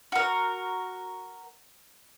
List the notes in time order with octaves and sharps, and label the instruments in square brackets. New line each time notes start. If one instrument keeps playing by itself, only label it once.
[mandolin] F#4 A#4